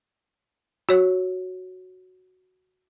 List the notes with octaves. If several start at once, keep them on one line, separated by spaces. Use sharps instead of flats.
F#4 C#5